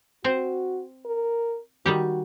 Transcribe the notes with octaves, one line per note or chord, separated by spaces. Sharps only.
C4 F#4 C5
A#4
D#3 G3 F#4 G4